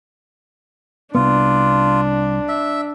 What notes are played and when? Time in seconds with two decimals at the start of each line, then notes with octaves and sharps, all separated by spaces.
1.15 C2 B3 D4 F4
2.49 E5